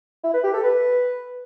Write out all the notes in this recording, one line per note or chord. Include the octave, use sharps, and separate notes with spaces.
E4
B4
G4
A4
B4